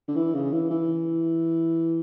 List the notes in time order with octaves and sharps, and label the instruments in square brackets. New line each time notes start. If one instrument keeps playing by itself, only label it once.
[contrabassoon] D3
E3
C#3
E3
E3